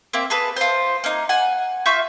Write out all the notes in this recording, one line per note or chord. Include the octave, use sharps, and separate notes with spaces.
A#3 C4 E5
G#4 A4 B4
F4 C5
A#3 D#4
F#5 G#5
F4 E5 C#6 G6